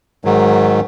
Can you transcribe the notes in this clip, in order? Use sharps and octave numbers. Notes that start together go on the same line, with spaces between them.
G#2 D#3 F#3